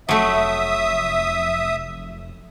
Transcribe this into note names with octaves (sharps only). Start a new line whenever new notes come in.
F1 F#3 A3 E5 D#6